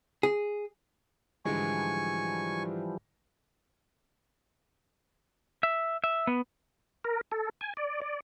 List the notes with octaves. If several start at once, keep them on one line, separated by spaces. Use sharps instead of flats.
G#4
G#2 D3 E3 F3 G3 G#3 G#5 C#6
E5
E5
B3
A#4
A4
G#5
D5
D5